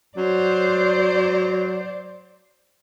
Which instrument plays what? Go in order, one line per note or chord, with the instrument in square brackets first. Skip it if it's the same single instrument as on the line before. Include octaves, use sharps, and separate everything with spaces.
[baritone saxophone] F#3 [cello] C5 D5